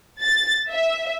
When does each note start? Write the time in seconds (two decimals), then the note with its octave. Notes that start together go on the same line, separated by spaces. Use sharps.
0.21 A6
0.71 E5